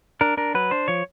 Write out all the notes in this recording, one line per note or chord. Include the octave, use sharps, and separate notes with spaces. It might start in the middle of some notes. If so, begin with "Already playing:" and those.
D4 A#4
D4 A#4
F#3 B4
D4 C5
F3 C#5